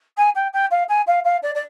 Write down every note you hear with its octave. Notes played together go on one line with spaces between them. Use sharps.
G#5
G5
G5
F5
G#5
F5
F5
D5
D5